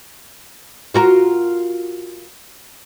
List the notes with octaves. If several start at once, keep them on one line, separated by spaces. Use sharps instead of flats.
F4 F#4 A#4